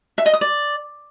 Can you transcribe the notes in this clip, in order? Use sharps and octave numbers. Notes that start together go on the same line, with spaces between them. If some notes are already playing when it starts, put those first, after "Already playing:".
E5
D#5
D#6
D5